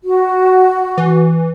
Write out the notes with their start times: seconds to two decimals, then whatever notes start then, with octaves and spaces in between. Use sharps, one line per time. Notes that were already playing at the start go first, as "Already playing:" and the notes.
0.03 F#4
0.97 E3